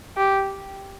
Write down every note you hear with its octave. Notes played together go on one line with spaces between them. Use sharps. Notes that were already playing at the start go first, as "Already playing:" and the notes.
G4